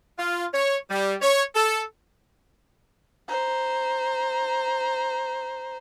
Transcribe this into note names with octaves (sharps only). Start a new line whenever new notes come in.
F4
C#5
G3
C#5
A4
C5 A#5